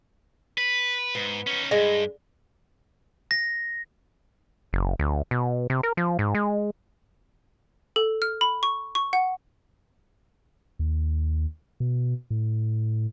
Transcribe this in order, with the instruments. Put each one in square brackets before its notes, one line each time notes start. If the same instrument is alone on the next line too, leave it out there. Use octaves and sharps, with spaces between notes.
[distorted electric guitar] B4
[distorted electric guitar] G#2 [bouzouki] B3
[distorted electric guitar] C#4 D#4
[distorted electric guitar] G2 [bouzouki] G#3
[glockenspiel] A#6
[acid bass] F#1
D2
B2
C3
A#4
F3
G#2
G#3
[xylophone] A4
F6
B5
C#6
C#6
F#5
[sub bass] D#2
B2
A2